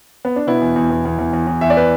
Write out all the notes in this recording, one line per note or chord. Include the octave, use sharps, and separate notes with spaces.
B3
D4
B2 B3 E4
E2
E2
E2
E2
E2
E2
E2
E2 E5
D5
B4